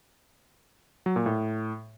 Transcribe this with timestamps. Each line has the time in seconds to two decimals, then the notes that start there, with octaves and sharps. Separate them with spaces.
1.06 F#3
1.16 A#2
1.26 A2